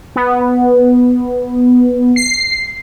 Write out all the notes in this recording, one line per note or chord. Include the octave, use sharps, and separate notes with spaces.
B3
C7